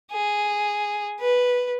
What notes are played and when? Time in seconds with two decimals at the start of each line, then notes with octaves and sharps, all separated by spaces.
0.12 G#4
1.20 B4